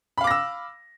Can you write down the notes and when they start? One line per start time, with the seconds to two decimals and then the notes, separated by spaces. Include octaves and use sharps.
0.18 B5
0.21 F5
0.24 D6
0.27 A#6
0.31 E6